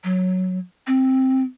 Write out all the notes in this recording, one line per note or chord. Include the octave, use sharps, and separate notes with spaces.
F#3
C4